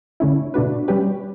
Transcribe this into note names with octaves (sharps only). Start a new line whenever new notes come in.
D3 A3 C#4 E4
B2 A3 D4 F#4 B4
G3 C#4 G4 B4